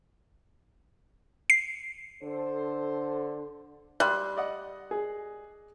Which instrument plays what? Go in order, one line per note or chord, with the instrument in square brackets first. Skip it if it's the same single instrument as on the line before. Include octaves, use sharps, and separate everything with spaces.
[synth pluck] C7
[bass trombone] D3 [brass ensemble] A4 C5
[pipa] G3 [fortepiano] E5 C6 [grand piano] F#6
[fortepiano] D5 D#5 F#5
[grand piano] G#4